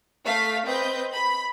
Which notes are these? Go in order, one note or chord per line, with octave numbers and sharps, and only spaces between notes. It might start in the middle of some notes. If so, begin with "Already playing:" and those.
A3 F5 B6
C4 B4 D#5 G6
B5